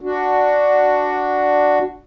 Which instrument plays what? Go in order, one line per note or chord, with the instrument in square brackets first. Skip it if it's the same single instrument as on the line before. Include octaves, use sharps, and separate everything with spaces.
[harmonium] D4 F#4